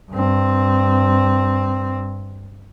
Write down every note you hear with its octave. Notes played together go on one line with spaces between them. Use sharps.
G2 C4